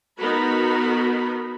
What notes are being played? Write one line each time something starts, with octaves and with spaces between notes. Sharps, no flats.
B3 D#4 F#4 A#4 B5